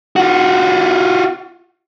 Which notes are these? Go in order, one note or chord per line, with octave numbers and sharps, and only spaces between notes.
F4 F#4